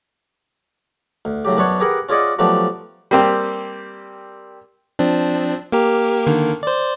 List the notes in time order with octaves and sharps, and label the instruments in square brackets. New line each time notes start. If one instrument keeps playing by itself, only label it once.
[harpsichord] D2
A2 C#3 F#3 G4
F#2 B3 D4 B4 C#5 C#6
G4 G#4 A#4 B4 F#5
C#4 F4 G#4 D5 D#5 F#5
F3 F#3 A3 B3 D4 G4
[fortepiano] G3 A#3 C4 G4
[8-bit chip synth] F3 C4 D4
A#3 G4 A#4
D3 D#3 A#3
C5 D5